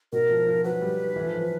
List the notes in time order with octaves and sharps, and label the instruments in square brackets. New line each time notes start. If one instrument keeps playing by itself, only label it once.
[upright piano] B2 [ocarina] A#4
[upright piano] F3
F3
[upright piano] F#3 [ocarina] B4
[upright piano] G3
E3
F3
E3
F3